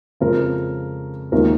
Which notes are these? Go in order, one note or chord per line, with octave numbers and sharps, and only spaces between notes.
F2 C#3 G#3 F4 A#4
D#2 D#3 G#3 F4 A#4